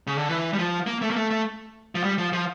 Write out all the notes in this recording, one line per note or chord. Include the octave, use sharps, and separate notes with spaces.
C#3
D3
E3
G3
F3
A#3
A3
A#3
A3
A3
F3
G3
F3
F3